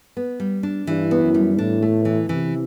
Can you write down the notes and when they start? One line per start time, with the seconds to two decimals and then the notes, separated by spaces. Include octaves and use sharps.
0.17 B3
0.40 G3
0.63 D4
0.87 G2 E3
1.11 B3
1.23 F#2
1.34 G3
1.58 A2 D4
1.82 A3
2.05 E3
2.29 C3 E3